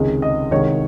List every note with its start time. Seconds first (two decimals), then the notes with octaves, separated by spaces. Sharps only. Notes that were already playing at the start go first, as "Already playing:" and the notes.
Already playing: C#2 C3 D#3 G#3 C#4
0.22 D#5
0.51 C2 C3 D#3 G#3 C#5